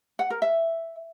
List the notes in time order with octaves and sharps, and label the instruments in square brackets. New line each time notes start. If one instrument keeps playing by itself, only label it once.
[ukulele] F#5
A#4
E5